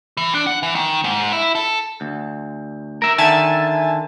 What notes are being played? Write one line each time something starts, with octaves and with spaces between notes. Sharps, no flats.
E3
D4
F#5
E3
D#3
G#2
E4
A4
D2
A#4 E5
D3 D#3 E5 G#5 A5